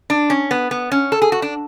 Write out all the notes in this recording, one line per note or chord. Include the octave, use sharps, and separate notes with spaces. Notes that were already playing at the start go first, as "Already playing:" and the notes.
D4
C#4
B3
B3
C#4
A4
G#4
F#4
D4